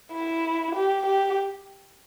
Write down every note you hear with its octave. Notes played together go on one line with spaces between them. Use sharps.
E4
G4
G4